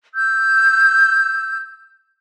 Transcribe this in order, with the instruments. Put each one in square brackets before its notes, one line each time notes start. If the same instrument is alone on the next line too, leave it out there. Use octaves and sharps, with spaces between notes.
[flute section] E6 G6